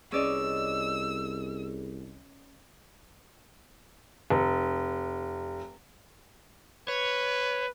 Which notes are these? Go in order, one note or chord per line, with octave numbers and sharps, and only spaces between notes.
C2 C#4 G#4 B4 D5 D#5 E6
F1
B4 C#5